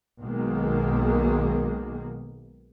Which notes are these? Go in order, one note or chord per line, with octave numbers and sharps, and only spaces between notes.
B1 B2 D#3 G#3 A#3